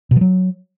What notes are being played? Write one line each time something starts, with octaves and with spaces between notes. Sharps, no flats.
B2
F3
F#3